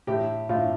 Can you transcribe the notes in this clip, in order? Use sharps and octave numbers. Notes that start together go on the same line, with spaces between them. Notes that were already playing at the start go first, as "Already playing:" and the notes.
A2 G4
A2 F4